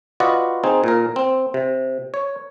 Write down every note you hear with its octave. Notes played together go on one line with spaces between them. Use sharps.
F4 F#4 B4 D5 D#5 F#5
C4 D#4 G#4
A#2 A#4
C4
C3
C#5